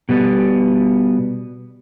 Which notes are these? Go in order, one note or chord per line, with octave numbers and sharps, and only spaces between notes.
B2 G3 B3